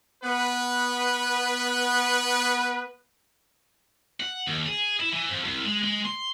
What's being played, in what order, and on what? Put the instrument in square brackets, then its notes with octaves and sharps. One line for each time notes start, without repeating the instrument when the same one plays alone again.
[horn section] B3 B4
[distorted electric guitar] F#5
D#2
G#4
E4
E3
F2
C2
G#3
G#3
C6